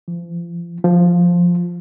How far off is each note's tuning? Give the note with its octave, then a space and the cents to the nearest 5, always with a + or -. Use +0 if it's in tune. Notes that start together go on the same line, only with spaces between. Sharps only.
F3 -35
F3 +5